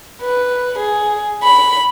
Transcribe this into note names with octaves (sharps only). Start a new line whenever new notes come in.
B4
G#4
B5